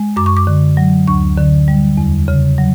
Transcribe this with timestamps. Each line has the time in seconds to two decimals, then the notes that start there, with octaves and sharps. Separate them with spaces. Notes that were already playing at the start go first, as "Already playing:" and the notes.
Already playing: G#3
0.16 F#2 D6
0.26 C#6
0.37 D6
0.47 D3
0.77 F#3
1.07 D2 C#6
1.38 D3
1.68 G3
1.97 E2
2.28 C#3
2.58 F#3